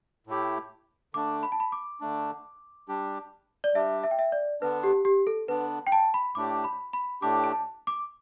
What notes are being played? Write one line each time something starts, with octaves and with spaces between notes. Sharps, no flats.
A2 A3 E4 G4
D3 A3 D4 D6
B5
A5
B5
D6
D3 A3 D4
G3 D4 G4
D5
G3 D4 G4 E5
E5
G5
E5
D5
D3 B3 D4 B4
G4
G4
A4
D3 B3 D4 B4
G5
A5
B5
A2 A3 D4 G4 D6
B5
B5
A2 A3 D4 G4 D6
A5
D6